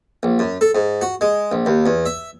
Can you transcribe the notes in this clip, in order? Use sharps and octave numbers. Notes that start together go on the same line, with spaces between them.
A#1
F#2
A4
G#2
F#4
G#3
A#1
D#2
E2
E5